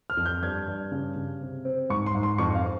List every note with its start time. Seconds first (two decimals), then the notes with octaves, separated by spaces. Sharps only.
0.10 F6
0.17 F2
0.26 G6
0.42 G2 G#6
0.67 G2
0.92 C#3
1.16 C#3
1.41 C3
1.65 C4
1.90 G#2 C#6
2.06 C6
2.15 G#2
2.23 C6
2.38 F2 C#6
2.55 F5
2.64 C4